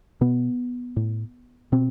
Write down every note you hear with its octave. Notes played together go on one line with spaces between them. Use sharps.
B2 B3
A2
B2 C4